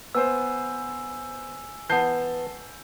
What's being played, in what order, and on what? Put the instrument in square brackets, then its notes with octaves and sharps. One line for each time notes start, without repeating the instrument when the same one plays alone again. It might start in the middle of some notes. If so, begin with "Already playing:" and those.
[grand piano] B3 C5 [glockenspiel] G#5 E6
[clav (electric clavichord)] E3 B3 [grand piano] A5 G6 C7